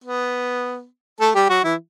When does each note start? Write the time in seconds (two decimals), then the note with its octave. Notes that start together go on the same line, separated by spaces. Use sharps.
0.04 B3
1.20 A3 A4
1.35 G3 G4
1.49 F#3 F#4
1.64 E3 E4